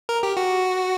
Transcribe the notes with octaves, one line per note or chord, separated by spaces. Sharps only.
A#4
G4
F#4